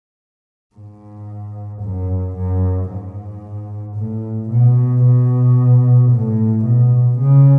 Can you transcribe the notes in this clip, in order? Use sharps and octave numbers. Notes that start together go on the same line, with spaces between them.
G#2
F#2
F#2
G#2
A2
B2
B2
A2
B2
C#3